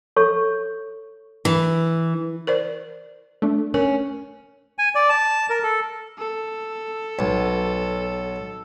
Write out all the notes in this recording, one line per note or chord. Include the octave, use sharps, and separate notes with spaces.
A4 C#5 C#6
E3
A#4 C5 D5
A3 D4
C#4 A#4
G#5
D5
A5
A#4
A4
A4
B1